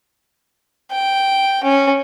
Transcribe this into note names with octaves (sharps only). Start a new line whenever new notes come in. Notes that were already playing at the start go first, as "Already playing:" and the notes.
G5
C#4